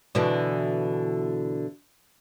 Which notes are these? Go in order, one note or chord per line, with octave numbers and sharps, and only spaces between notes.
B2 D3 E3